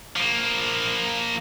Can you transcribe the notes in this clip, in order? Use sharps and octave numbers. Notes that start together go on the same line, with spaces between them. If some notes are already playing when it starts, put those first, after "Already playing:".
F3 A#3